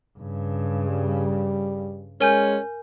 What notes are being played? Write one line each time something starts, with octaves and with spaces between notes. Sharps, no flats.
G2 C#3
G3
G#3 C#4 A#4 G#5 G6